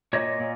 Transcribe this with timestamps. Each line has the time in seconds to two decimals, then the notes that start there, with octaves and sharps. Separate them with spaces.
0.13 A#2 C#5 D#5
0.40 A#2